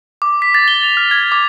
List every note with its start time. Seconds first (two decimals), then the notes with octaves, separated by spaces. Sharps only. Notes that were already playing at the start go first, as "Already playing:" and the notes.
0.22 D6
0.42 B6
0.55 A6
0.68 G7
0.83 F7
0.97 F6
1.11 G#6
1.32 D6